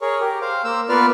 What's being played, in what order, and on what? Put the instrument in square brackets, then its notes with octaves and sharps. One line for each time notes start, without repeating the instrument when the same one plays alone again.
[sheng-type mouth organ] G#4 A#4 C#5
G4 A#4
C5 F5
A#3 C5 E6
A#3 B3 F4 B4 D5 F6